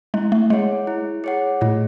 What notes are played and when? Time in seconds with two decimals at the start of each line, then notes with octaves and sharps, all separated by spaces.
0.14 G#3 E4
0.32 A3
0.50 G#3 G#4 C#5 F#5
0.87 E4
1.24 G#4 C#5 F#5
1.61 A2 A3